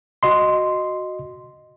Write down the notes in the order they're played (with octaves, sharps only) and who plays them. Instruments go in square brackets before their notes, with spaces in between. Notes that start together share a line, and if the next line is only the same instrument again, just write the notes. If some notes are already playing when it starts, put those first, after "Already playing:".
[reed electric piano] F#4 D#5 C6